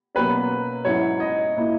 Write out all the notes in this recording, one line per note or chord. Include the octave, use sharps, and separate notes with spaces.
B2 F#3 A#3 C#4 B4
G#2 F#3 C#4 E4 C#5
D#5
A#2 A#3 E4